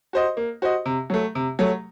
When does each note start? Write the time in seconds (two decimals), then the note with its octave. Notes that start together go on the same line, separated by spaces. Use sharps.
0.13 F#4 C5 D#5
0.37 A#3
0.62 F#4 C5 D#5
0.86 C3
1.10 F#3 A3
1.35 C3
1.59 F#3 A3